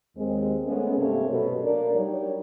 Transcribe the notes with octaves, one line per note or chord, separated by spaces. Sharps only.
D#2 G#3 C4
G#3 A3 B3 C#4
G2 C3 A#3 C#4 A4 C#5
B2 F#3 A3
A#3 D4 D5
F#3 G3 D#4 C#5